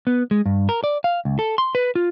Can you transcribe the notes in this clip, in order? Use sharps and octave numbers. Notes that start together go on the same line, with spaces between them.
B3
G#3
G2
A#4
D5
F5
C#2
A4
C6
B4
F4